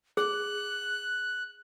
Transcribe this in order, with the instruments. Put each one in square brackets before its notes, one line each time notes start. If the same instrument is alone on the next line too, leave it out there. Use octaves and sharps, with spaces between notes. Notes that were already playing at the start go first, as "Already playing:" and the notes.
[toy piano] G#4 [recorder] F#6